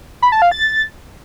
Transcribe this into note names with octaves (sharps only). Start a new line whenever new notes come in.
B5
A5
F5
A6